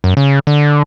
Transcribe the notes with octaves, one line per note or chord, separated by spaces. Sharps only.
F#2
C#3
D3